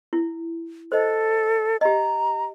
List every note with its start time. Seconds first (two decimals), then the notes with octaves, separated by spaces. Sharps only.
0.13 E4
0.92 A4 C5 D#5
1.81 G4 D#5 A#5